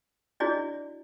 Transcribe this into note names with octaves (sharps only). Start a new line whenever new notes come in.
D4 E4 F#4 G#4 D5 D#5